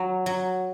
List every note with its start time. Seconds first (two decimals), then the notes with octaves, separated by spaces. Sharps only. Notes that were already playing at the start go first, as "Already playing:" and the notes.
Already playing: F#3
0.26 F#3